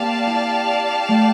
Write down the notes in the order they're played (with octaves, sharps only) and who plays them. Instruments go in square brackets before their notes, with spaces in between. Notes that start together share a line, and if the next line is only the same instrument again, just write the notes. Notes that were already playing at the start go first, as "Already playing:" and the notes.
Already playing: [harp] A#3 C4 [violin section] G4 D5 F5 A5
[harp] E4
A3